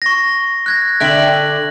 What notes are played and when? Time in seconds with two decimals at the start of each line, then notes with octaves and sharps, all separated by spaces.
0.02 C#6 A#6
0.66 F#6 G#6 A#6
1.00 D3 E5 G5 F#6 F#7